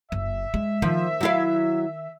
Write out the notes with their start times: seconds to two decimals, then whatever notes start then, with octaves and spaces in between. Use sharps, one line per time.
0.12 F#1 E5
0.54 G#3
0.82 D#3 F3
1.21 F#3 E4 F5